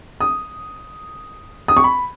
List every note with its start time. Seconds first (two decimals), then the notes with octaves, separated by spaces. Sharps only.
0.21 D#6
1.68 D#6
1.77 C#6
1.84 B5